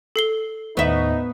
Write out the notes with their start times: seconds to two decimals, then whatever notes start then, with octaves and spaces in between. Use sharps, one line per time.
0.16 A4 C7 G7
0.77 D#2 A2 B3 D#4 E5 C#6